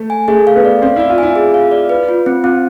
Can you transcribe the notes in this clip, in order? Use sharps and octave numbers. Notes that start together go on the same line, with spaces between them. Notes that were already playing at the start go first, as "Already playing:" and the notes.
Already playing: A3
G#5
A3 G#4
F5
B3
D5
C4 F5
E4
D5
F4
E4 G#5
G#4
F5
D5
B4
F4
C4
C4 F4